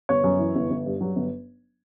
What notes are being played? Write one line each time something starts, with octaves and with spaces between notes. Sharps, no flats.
G1 C#5
F#2
E3
G1
G1
G2
F#3
G1